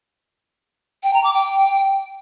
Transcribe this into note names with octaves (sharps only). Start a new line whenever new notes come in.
G5
A#5
D6
G5